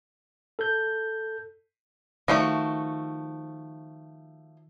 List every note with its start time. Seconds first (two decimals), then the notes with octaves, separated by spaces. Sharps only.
0.59 A4 G6
2.28 D#3 F3 A3 F#4 E5